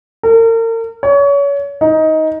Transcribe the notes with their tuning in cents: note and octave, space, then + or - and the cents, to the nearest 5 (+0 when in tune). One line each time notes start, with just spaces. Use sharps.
A#4 -40
C#5 +30
D#4 +15